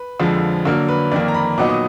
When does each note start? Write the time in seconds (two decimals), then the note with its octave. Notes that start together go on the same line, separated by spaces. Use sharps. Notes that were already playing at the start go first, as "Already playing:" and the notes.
Already playing: B4
0.20 F2 D3 F3 G#3
0.65 D3 F#3 A#3 D4 A#4
0.89 B4
1.12 F2 D#3 A#3 D5
1.28 A#5
1.34 B5
1.58 A#2 F#3 B3 D#4 D6
1.69 D#6